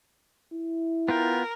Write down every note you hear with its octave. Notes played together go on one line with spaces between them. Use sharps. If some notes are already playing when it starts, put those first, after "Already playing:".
E4
B3 F4 A#4 G5